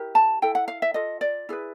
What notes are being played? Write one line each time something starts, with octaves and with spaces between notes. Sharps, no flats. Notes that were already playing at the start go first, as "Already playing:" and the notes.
Already playing: E4 G4 A#4
A5
E4 A4 G5
F#5
F5
E5
F4 A4 D#5
D5
E4 G#4 B4